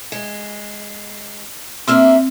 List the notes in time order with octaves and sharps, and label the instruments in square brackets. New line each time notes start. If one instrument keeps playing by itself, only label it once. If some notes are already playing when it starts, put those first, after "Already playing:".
[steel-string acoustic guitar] G#3
[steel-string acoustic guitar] A#3 D4 E5 [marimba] C4 E6 F6